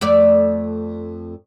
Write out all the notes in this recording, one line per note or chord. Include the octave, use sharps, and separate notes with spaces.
F2 A3 D5